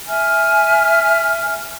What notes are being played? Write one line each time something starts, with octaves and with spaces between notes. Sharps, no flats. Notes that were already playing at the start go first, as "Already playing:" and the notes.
E5 G#5 F6